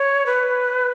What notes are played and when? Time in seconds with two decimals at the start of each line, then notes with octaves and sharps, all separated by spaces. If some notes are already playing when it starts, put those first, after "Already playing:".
Already playing: C#5
0.26 B4